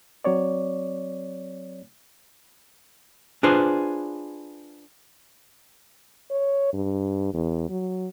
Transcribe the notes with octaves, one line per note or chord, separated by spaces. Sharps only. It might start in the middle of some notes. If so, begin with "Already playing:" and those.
F#3 C4 C#5 D5
D4 F4 G#4 B4 C5
C#5
G2
E2
F#3